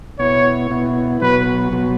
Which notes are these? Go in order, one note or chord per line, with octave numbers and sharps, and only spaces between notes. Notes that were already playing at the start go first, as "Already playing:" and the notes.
B2 B3 E4 C#5
B2 B3 E4
B2 F#3 B3 F#4 B4
B2 F#3 B3 F#4